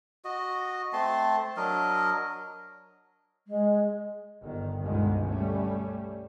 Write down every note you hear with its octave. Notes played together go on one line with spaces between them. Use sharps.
F#4 D#5
A3 C4 A5 C6
F#3 D4 A#4 D#5
G#3
G1 D#3
G1 C#2 B2 D3 D#3 G#3
G3 A3 C#4